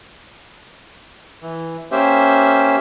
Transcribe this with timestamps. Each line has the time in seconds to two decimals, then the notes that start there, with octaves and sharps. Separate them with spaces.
1.42 E3
1.91 A#3 C#4 G4 C5 E5